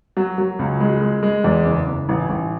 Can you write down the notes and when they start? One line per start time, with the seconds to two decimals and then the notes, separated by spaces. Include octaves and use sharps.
0.17 F#3
0.38 F#3
0.59 C#2
0.80 G#3
1.01 G#3
1.23 G#3
1.44 E2
1.66 F#1
1.87 F#1
2.09 A1
2.30 A1